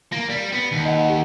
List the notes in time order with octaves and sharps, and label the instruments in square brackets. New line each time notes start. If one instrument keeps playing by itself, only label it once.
[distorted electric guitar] A#3 [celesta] A#6
[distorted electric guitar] G3
B3
D#2
[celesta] D#5 F#5
G4